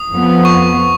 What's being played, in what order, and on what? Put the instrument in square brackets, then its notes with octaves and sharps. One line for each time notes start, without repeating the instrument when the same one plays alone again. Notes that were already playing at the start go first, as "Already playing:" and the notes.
Already playing: [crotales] D#6
[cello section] F2 F3 B3
[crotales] C#6